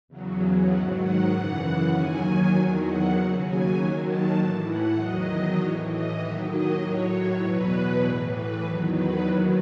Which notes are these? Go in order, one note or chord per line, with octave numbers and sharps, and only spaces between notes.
E2 C#3 F#3
G#2 D#3 F#3 F#5
F#5
F#2 C#3 E3 F#5
D#2 D#3 F#3 G#5
E2 D#3 F#3
F#5
D#2 C#3 F#3
G#5
D#2 D#3 F#3
A5
A2 E3
F#5
E2 D#3 F#3 D#5
A2 E3 C#5
D#5
D#2 D#3 F#3 E5
D#5
A2 F#3 C#5
E2 B2 F#3 B4
A2 E3 G#4
B4
E2 D#3 F#3
B4
D#2 D#3 F#3 E4